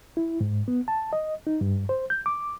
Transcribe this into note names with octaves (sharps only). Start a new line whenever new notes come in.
E4
G#2
B3
A5
D#5
D#4
G2
C5
G6
D6